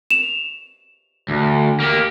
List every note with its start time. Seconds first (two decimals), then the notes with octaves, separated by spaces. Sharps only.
0.10 E7 F7
1.29 D2
1.80 A#3 G4